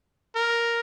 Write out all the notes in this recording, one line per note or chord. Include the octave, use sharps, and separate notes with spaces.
A#4